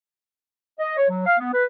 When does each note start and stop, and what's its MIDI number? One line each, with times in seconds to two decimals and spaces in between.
0.79 0.96 75
0.97 1.05 73
1.09 1.23 54
1.26 1.39 77
1.39 1.53 59
1.53 1.64 71